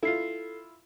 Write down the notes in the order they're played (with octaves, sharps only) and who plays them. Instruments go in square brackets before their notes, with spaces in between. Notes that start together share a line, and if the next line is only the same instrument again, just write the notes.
[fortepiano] E4 F4 [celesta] A4 C7